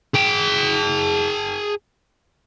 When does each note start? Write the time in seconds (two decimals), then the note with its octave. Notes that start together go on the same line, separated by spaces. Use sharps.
0.14 G#4 G5